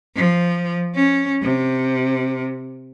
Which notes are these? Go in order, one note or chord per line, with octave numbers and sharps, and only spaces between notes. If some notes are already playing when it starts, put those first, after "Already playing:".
F3
C#4
C3